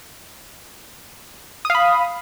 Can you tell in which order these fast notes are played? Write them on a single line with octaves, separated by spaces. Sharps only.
D#6 F5 B5